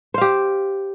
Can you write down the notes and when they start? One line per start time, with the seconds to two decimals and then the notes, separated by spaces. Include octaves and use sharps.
0.14 C5
0.18 F5
0.21 G4